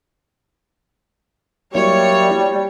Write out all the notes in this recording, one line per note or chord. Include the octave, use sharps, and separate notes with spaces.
F#3 G3 A#3 E4 C#5